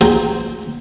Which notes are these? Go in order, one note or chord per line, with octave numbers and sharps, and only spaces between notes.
G#4 C5 G5 A#5